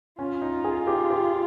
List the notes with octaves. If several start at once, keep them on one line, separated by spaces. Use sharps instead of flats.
C#4 F4
D#4
G#4
G4
G4